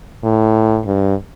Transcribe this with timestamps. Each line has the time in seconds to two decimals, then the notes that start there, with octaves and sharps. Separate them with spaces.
0.23 A2
0.86 G2